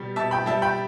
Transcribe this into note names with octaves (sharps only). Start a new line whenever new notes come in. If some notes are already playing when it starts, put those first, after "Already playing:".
Already playing: B2 G3
B2 E5 A5
G5 B5
G3 E5 A5
G5 B5